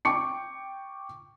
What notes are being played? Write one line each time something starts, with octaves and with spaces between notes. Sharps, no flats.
G5 C#6 D6 C#7